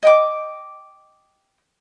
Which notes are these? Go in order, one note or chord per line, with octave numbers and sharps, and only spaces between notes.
D#5 G5 D6